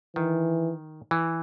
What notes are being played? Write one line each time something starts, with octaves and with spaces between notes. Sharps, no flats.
D#3 E3
E3